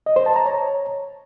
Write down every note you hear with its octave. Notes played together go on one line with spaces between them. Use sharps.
D#5
C5
A5
A#5
C#5